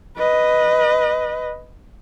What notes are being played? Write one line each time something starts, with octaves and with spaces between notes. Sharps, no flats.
B4 D#5